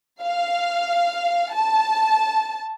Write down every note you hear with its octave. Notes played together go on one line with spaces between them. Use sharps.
F5
A5